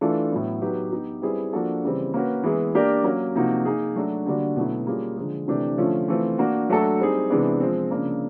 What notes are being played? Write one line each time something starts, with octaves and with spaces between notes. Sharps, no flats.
E3 A3 D4 F4 A4
A2 F#3 B3
F#3 B3 D#4 G4 B4
B3 D#4 G4
G3 C4 E4 G#4 B4
F3 A#3 D4 F#4 A4
C#3 E3 G3 C4
A#3 C#4 F#4 B4
E3 G#3 B3 E4 G#4
A#3 D4 G4 A#4 D5
F#3 A#3 C#4
C3 F3 A#3 D#4 F#4
A#3 D#4 G#4
F#3 A3 D4 F#4
D3 G3 A#3 D4 F#4
B2 F#3 A3 C#4 E4
G3 A#3 C#4 F4 G#4
D3 F3 G#3
C3 E3 A3 D4 G4
D3 F3 A3 C#4 F4
E3 A3 C4 F4
A#3 D4 F#4
F#3 A3 D4 F#4 A4
G3 C4 D#4 G#4
C3 E3 G#3 B3 D4
F3 G#3 C4
C#3 F3 A#3 D4